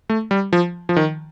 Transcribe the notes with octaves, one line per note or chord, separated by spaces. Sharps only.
A3
G3
F3
F3
D#3